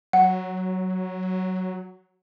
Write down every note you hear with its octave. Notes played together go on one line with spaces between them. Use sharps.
F#3 F#5